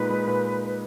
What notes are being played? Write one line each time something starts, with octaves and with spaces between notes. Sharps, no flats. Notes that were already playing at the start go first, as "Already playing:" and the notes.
Already playing: A#2 G#3 D#4 B4
G#3 D#4
A#2